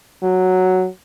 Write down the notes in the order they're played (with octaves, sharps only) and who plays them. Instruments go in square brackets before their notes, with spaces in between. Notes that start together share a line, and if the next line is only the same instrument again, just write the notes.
[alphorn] F#3